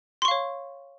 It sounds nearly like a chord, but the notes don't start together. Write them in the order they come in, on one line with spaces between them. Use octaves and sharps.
C6 C#6 F5 C#5